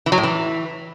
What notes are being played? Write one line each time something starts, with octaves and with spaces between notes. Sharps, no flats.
E3
F#3
A2
E3